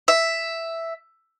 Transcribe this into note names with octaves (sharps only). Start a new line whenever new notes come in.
E5